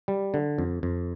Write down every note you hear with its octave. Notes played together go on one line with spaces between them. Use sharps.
G3
D3
F2
F2